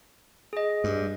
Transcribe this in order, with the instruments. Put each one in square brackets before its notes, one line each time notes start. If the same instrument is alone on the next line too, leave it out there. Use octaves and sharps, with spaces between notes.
[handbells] G#4 D#5
[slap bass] G2